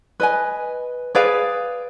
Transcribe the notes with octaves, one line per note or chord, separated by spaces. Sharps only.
B4 D#5 G#5
G#4 B4 D5 F5